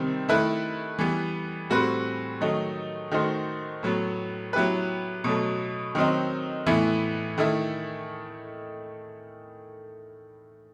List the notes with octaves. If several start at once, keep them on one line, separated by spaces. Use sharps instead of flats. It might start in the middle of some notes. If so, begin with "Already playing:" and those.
Already playing: C3 D#3 G3 C4
D#3 A3 E4 B4
E3 G3 B3
A2 G3 C4 F#4 B4
D#3 F#3 A3 D#4
D#3 A3 D#4 F#4 C5
A2 F#3 B3
F#3 B3 E4 G4 B4
B2 F#3 A3
D#3 F#3 C4 D#4
A2 E3 B3 E4
D#3 A3 E4